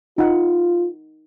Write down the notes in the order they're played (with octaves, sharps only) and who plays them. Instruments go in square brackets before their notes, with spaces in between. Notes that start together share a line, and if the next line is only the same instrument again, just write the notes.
[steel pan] D#4 F#5 [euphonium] F4